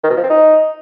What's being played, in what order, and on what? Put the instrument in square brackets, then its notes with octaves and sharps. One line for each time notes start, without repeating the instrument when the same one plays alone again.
[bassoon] D#3
B2
F3
C4
D#4